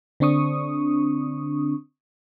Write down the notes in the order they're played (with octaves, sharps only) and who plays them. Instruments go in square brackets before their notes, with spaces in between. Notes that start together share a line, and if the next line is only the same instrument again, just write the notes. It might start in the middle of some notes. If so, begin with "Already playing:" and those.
[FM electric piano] D3 C4 D4 C#6 D#6